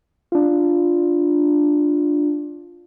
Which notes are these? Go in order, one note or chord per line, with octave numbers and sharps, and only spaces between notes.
D4 F4